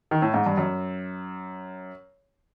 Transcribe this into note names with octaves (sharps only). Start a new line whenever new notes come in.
D#3
A2
G#2
G2
F#2